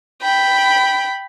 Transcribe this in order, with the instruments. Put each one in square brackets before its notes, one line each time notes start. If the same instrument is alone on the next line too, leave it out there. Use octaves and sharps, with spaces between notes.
[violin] G5 B5